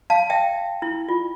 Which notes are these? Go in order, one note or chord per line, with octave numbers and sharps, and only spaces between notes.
F5 A5
E5 G5
E4
F4